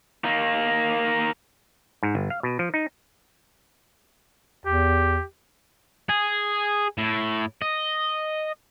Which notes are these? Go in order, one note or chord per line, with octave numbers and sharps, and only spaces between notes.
A#3 D#4
G#2
G1
F5
B2
F3
D#4
E2 G4
G#4
A2
D#5